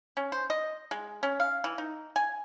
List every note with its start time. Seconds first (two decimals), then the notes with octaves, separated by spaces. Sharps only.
0.17 C#4
0.32 C5
0.50 D#5
0.91 G#3
1.23 C#4
1.40 F5
1.64 E3
1.78 D#4
2.16 G#5